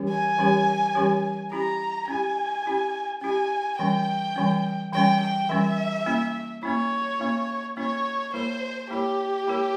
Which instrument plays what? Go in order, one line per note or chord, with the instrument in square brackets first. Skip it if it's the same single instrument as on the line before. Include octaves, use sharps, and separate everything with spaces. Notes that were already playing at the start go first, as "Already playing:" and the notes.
Already playing: [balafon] E3 G3 C#4 G4 C#5
[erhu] G#5
[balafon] E3 G3 C#4 G4 C#5
E3 G3 C#4 G4 C#5
[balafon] C#4 E4 G4 [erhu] A#5
[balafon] C#4 E4 G4 [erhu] G#5
[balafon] C#4 E4 G4
[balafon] C#4 E4 G4 [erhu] G#5
[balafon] E3 G3 C#4 [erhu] G5
[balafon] E3 G3 C#4
[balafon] E3 G3 C#4 [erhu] G5
[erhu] G5
[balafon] E3 G3 C#4 [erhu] E5
[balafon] A#3 C#4 E4
[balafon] A#3 C#4 E4 [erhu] C#5
[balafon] A#3 C#4 E4
[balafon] A#3 C#4 E4 [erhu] C#5
[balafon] A#3 E4 A#4 C#5 [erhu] C5
[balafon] A#3 E4 A#4 C#5 [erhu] G4
[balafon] A#3 E4 A#4 C#5